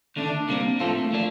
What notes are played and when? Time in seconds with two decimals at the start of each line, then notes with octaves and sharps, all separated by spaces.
0.16 D#2 D3 A3 D4
0.48 C3 G3 A#3 C4
0.80 A2 F3 A3 C4 F4 A4
1.12 F3 A#3 D4